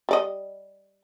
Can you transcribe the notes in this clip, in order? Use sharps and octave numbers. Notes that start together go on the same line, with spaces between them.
G3 D5 D#5